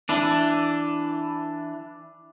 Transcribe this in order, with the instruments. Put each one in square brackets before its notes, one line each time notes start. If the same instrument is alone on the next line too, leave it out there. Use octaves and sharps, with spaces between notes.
[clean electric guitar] E3 D4